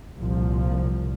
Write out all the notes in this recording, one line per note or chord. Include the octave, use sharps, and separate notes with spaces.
C2 A#2 F3